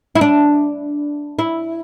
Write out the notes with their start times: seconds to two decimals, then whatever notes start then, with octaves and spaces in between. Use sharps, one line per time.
0.15 E4
0.21 D4
1.39 E4